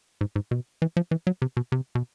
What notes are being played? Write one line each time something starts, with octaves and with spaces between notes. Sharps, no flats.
G#2
G#2
B2
E3
F3
E3
F#3
C3
B2
C3
B2